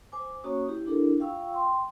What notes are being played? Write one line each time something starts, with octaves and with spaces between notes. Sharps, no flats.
C5 G#5 D6
A#3 C#4 F#4 C#5 C#6 D#6
E4 G4
D4 E4 G4 A4 A#4
F4 F5 G5 C#6 E6
G5 C6